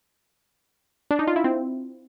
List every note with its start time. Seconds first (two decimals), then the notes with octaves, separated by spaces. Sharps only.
1.11 D4
1.19 D#4
1.27 F4
1.36 E4
1.44 C4